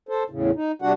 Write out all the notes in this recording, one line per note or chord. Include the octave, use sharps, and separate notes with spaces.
A4 C5
E2 A2 C#3
D#4
C3 G3 D4 F#4 F#5